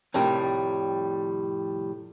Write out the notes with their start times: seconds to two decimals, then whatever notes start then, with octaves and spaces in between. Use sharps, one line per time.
0.14 F2 A2 C3 D#3 G3